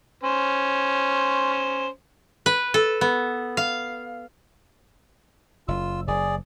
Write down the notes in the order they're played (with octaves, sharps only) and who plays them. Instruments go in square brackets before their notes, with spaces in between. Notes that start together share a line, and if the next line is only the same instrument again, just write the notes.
[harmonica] C#4 C5
[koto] B4
A4
B3
F5
[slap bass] F#1 [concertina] F4 E6
[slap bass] F#1 [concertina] G#4 D5